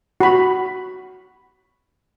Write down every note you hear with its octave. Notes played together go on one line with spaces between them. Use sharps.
F#4 B5